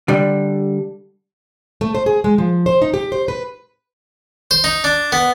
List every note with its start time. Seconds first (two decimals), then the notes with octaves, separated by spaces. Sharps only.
0.08 D3 G3
1.81 A3
1.95 C5
2.06 G#4
2.24 G#3
2.38 F3
2.66 C5
2.82 D#4
2.94 G4
3.12 C5
3.28 B4
4.51 C5
4.64 D#4
4.84 D4
5.12 B3